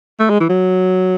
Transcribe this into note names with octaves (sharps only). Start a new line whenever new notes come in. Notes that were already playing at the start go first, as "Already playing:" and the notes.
A3
G#3
E3
F#3